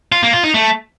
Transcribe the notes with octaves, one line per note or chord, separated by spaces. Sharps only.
F4
A#3
F4
D#4
A3